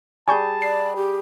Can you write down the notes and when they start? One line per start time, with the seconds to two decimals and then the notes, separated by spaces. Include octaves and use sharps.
0.28 G3 G#4 G#5 A5 C#6 G6
0.62 D5 C7
0.96 G4